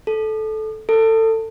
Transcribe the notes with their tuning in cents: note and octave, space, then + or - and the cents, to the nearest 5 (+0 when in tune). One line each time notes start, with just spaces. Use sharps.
A4 -15
A4 +25